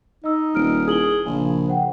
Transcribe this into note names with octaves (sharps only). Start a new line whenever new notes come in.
D#4 D#5 E6
D#1 F6 D7
E4 G#4 F#7 G7
A#1 C#3 G#5
C5 F#5 G5